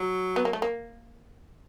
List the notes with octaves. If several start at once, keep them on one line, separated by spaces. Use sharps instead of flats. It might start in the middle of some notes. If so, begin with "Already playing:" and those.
Already playing: F#3
B3
A#3
A3
A#3